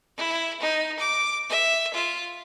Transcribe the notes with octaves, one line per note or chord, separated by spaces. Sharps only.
E4
D#4
D6
E5
F4